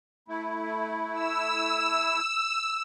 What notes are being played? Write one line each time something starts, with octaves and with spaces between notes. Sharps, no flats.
A3 E4
E6